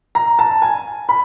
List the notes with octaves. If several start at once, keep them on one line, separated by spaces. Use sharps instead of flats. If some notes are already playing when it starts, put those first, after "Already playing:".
A#5
A5
G#5
B5